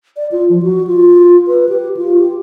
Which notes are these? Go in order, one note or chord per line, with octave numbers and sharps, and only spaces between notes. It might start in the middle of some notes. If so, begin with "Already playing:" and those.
D5
F4
F3
F#4
F4
B4
G4
F4
G4